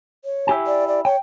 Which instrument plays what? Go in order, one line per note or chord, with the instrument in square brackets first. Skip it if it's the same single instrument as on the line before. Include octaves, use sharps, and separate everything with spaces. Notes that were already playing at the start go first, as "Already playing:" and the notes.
[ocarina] C#5
[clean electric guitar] E4 G4 G#5
[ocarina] D5
D5
[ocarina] C#5 [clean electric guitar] G5